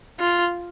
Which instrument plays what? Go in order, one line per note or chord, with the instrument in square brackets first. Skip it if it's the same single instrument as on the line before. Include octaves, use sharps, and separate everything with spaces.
[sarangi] F4